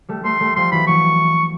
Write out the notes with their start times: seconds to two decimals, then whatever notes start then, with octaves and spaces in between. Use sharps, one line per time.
0.09 G3 A3
0.24 G3 A3 C6
0.40 G3 A3
0.56 F3 G3 C6
0.71 E3 F#3 B5
0.87 E3 F#3 C#6